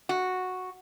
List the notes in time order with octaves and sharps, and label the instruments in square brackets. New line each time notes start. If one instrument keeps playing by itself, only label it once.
[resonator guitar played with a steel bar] F#4